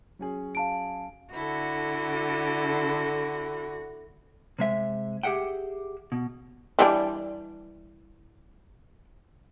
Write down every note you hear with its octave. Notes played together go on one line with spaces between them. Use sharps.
F#3 C#4 G#4
F5 A5 D7
D3 E4 F#4 A4
C3 G#3 E5
G4 G#4 E5 F#5 G5
B2
E3 G3 D4